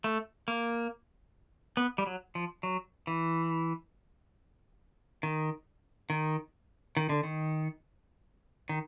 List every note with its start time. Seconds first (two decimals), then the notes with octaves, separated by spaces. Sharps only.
0.04 A3
0.48 A#3
1.77 B3
1.98 G3
2.06 F#3
2.35 F3
2.63 F#3
3.07 E3
5.23 D#3
6.10 D#3
6.97 D#3
7.09 D3
7.23 D#3
8.69 D#3